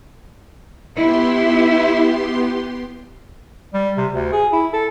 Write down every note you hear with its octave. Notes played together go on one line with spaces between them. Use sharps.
B3 E4 G4 C6
G3
C3
D2
G#4
E4
A4